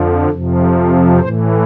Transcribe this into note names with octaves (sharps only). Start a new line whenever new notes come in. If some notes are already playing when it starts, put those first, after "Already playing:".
Already playing: F2 D3 F3
F2 C3 F3
A2 E3 C5